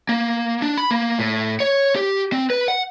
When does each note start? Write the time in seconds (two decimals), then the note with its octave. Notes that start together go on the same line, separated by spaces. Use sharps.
0.09 A#3
0.62 D4
0.78 B5
0.91 A#3
1.19 A2
1.60 C#5
1.96 G4
2.32 C4
2.50 B4
2.68 F#5